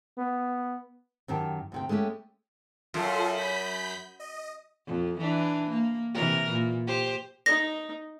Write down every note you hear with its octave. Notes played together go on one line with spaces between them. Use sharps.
B3
F#2 D#3 G4 A5
D2 C3 G5
G#3 A3 B3 C#4 E4 G4
F#2 F4 A4 C6
B5 G6 B6
D#5
F2
E3 D4
A#3
C3 E3 A#4
A#2
G4 C5
D#4 A#6